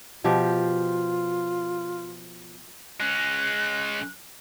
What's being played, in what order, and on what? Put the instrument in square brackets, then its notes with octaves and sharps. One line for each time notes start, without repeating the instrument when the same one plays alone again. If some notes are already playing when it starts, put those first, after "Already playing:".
[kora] B2 F3 G4 [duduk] F4
[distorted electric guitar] G#3 C#4 [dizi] F#6